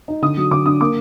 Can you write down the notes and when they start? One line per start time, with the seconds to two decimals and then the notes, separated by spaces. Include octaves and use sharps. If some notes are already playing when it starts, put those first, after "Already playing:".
0.08 D#4
0.22 D3 D#6
0.37 F#3
0.51 D3 D6
0.66 D4 D#6
0.81 A#3 D6